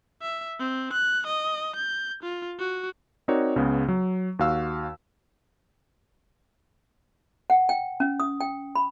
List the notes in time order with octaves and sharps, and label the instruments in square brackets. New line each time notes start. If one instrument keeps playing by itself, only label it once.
[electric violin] E5
C4
F#6
D#5
G6
F4
F#4
[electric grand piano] C4 D#4 F#4 A#4 C#5 D5
C#2 C#3 B3
F#3
D#2 F#4 F5 E6
[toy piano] F#5
G5
C#4
D#6
G5
B5